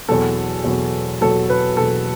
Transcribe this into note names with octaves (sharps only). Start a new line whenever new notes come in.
E2 B2 F#3 A4
E2 B2 F#3
E2 B2 F#3 A4
B4
E2 B2 F#3 A4